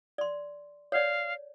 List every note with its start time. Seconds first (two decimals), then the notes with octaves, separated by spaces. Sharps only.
0.18 D5 C6
0.92 C#5 D5 F5